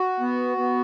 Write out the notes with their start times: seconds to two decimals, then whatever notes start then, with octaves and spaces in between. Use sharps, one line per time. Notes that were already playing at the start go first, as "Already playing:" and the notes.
Already playing: F#4
0.20 B3
0.57 B3